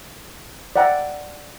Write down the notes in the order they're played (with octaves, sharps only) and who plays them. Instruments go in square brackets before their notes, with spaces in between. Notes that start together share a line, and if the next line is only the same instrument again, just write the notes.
[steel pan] D5 E5 F#5 G5 A#5